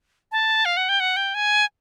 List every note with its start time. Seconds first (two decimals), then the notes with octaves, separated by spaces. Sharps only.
0.32 A5
0.65 F5
0.77 F#5
0.89 G5
1.00 F#5
1.16 G5
1.34 G#5